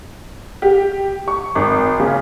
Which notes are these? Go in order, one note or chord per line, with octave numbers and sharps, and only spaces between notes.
G4
C#6
G#1
C#3